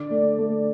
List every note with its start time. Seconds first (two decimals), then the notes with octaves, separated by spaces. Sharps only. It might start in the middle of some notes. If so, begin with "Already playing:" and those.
Already playing: D3 D5
0.10 A3
0.38 A3